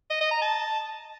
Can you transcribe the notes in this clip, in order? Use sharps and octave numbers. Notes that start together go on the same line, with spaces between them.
D#5
D#5
A#5
A5